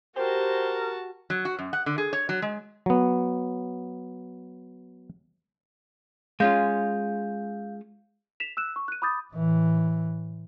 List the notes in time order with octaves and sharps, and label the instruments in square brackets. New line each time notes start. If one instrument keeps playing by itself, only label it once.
[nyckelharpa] F#4 A5 [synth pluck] G4 [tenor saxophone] A#4 [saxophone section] C5
[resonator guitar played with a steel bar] F#3
F#4
F#2
F#5
D3
G#4
C#5
F#3
G#3
[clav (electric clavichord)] F#3 B3
[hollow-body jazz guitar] G#3 C#4 F4 [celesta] F5 G6
[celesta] B6 E7 F7
E6 F#6 E7
C#6
F#6 D#7
B5 D6 D#6 G6 A6
[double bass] A2 E3